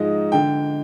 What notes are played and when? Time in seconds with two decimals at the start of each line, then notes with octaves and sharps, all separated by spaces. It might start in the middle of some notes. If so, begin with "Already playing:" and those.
Already playing: G#2 F3 G#3 D#5
0.32 D3 G5